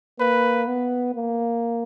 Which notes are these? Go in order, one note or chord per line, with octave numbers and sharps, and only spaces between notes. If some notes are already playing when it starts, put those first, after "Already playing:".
A#3 B4
B3
A#3